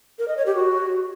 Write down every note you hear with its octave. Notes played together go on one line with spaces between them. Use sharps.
A#4
D#5
C#5
G4
F#4